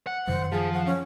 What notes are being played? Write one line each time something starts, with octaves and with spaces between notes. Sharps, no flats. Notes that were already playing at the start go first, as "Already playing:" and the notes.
F#5
F#2 D#3 C5
F3 G#4
F#5
C#4